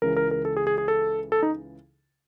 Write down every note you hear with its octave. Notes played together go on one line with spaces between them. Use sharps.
C#2 C#3 E3 A#4
A#4
A#4
A4
G#4
G#4
G#4
A4
A4
D#4